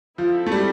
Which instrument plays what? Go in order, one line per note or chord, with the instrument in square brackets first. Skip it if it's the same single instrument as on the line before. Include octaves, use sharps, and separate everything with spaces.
[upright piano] F3 [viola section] C4 E4 A4
[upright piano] A3
G3